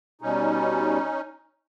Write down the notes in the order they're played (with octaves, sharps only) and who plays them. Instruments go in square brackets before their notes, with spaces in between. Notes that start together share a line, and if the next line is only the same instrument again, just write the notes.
[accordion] B2 G3 C#4 D#4